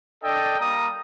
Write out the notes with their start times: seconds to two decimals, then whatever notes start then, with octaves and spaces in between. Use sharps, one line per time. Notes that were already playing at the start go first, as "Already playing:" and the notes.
0.24 D4 A4 D5 D#5 G5
0.60 G3 A#3 A#4 A#5 D#6